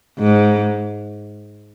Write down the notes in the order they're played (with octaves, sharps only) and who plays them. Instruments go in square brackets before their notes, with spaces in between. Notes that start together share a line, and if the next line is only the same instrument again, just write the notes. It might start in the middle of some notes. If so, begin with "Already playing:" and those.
[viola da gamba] G#2